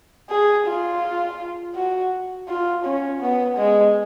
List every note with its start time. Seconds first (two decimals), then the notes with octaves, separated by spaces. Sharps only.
0.30 G#4
0.67 F4
1.75 F#4
2.49 F4
2.85 C#4
3.21 B3
3.58 G#3